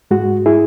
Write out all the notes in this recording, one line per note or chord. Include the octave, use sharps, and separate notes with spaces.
G#2 G#3 F#4
E4 G#4